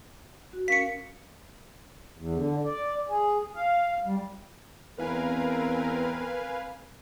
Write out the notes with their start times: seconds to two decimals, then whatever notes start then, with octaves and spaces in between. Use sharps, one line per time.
0.53 F#4
0.68 C#4 A#4 F5 B6 C#7
2.18 E2
2.36 D3
2.64 D5
3.09 G#4
3.55 F5
4.05 G3
4.98 E2 C4 A#4 B4 F5 G#5